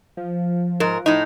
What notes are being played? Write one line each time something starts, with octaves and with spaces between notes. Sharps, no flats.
F3
G#2 A#4
A2 D#4